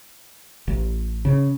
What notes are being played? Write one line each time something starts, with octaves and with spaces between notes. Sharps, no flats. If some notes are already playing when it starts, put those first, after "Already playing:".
A1
C#3